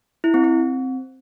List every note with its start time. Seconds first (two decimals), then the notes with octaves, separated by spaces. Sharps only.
0.24 E4
0.34 C4
0.44 C4